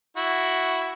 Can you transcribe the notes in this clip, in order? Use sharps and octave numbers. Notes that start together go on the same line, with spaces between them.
E4 F#4